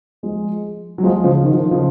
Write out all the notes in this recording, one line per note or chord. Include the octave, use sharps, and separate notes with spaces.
F3 G#3
F#3
F3 G#3
C#3 F3
D#3
F3
D#3
C#3 F3